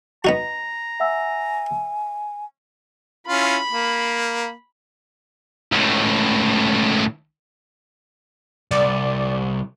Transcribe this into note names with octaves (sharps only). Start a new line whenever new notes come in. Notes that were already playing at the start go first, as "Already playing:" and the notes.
B3 D#4 F#4 A#5
E5 F#5 G#5 E6
C#4 E4 F4 B5
A#3
C#2 A2
C2 D5